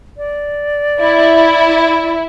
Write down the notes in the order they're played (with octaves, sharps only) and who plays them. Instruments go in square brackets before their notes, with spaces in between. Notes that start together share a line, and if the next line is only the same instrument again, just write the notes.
[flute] D5
[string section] E4